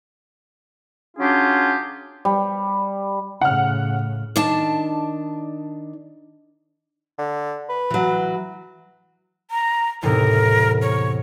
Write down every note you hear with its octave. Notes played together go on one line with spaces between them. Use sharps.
F#3 C#4 D4 F4 G4 G#4
G3
A2 C#3 F#5 F6
D#3 D4 A5
D3
B4
E3 F#3
A#5
E2 A2 C3 A#4
C#5